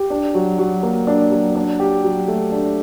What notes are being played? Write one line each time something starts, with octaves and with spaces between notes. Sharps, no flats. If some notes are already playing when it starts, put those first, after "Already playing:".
Already playing: G4
D4
F#3
F#3
A#3
D4
F#3
D4
G4
F#3
A3
D4